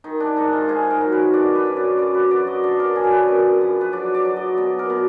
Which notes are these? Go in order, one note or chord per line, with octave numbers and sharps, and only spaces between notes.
D#3 D#4
D4
G#2 D#4
F4
G#2 G#4
A#4
F#3
B4
D3 D5
B4
F#2
D5
F#2 D5
B4
F#3 D5
D#5
D3 D5
A#4
F#2 G#4
A#4
B4
F#2
F3
B4
F#3 D5
D5
F#3
D#5
B2 D5
A#4
B2